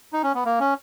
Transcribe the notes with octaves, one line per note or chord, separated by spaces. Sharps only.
D#4
C#4
B3
A#3
C#4